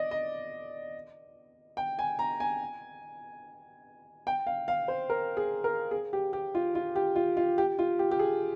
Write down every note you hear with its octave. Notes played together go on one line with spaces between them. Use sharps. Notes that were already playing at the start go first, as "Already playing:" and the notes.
Already playing: D5 D#5
D#5
G5
G#5
A#5
G#5
G5
F5
F5
C5
A#4
G#4
A#4
G#4
G4
G4
F4
F4
G4
F4
F4
G4
F4
G4
G4
G#4